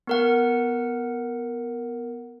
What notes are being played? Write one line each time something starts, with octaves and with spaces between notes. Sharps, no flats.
B3 A#4 F#5